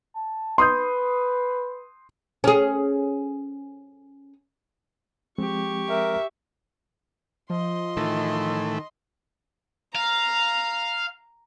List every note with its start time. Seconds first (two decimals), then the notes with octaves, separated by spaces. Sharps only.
0.15 A5
0.58 B4 C6 D#6 G6
2.44 C#4 G#4
5.38 F3 G#3 C4 G4 C#6
5.90 A#4 E5
7.50 F3 D#5 C6
7.97 A2 D#3 E3 A3
9.95 F5 A#5